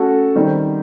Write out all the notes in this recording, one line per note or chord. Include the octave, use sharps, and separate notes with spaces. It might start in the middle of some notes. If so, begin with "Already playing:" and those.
Already playing: A3 C#4 F#4 A4
D#3 G3 C4